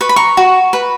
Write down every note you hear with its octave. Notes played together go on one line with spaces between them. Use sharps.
B4 C#6
B5
A#5 C#6
F#4
B4 B5